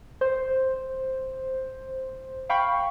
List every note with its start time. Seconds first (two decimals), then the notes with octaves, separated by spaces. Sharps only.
0.21 C5
2.49 F5 G5 B5 C#6